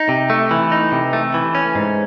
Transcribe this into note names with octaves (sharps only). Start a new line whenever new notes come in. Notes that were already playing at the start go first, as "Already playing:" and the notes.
Already playing: D#4
C3
A3
E3
D#4
C3
A3
E3
C#4
G#2